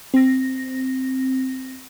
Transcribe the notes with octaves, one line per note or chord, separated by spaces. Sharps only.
C4 A#6